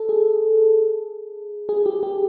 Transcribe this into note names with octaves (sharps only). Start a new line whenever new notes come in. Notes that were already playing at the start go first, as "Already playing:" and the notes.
Already playing: A4
G#4
G#4
G4
G4